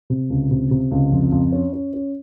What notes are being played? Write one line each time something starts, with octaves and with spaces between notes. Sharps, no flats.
C3
C#2
C3
C3
C#2
F2
F2
C#4
C#4
C#4